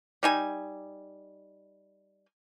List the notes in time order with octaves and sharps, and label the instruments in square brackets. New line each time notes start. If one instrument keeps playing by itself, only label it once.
[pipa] G3 D#4 G#5